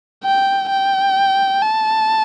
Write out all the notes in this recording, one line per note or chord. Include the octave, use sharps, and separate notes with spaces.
G5
G5
A5